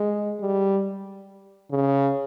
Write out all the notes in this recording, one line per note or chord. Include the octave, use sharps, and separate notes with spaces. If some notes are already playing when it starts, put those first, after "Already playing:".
Already playing: G#3
G3
C#3